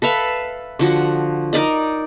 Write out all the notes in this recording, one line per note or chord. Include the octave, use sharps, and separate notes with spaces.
A4 B4 E5 F5
D3 F3 F#4
D#4 A#4 D5 D#5